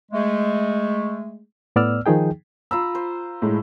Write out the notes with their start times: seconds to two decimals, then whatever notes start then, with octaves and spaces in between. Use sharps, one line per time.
0.12 G#3 A3
1.76 A2 B3 D5 E6 F6
2.06 D#3 F3 D#4 G#4 G5
2.71 F4 A#5 B5 E6
2.95 C5
3.42 A2 G#3